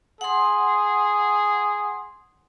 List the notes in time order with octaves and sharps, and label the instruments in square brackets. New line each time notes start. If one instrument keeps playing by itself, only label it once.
[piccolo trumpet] G#4 [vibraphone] F#5 C6